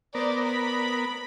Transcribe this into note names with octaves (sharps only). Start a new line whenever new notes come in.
B3 A#4 C5 D5
B5